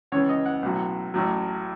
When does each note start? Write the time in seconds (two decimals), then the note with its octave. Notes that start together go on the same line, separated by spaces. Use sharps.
0.12 C#2 C#3 E3 C#5
0.29 D#5
0.46 F#5
0.62 B1 A2 F#3
1.14 A1 A2 F#3